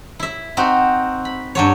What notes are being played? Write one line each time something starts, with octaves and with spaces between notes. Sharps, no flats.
E4 E5
C4 D#4 F#4
B5
G2 F#3 C#5